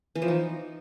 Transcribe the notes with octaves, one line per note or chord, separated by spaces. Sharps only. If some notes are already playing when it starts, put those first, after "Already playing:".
E3
F3
D#4